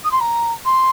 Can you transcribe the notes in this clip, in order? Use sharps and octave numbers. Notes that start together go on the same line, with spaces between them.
D#6
C6
A#5
C6